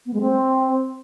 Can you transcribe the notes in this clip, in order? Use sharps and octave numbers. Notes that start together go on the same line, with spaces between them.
B3
G#3
C4